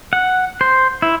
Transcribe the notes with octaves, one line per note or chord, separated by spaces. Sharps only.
F#5
C5
E4